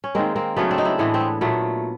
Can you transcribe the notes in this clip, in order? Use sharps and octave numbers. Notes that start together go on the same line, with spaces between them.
C#4
D#3 G#3 A#3 C4
A#3 C4
C#3 F#3 A3 B3 C#4
C4 D4
D#4
D4 E4
A2 E3 G#3 B3
C4
B3
A#2 F#3 A3 B3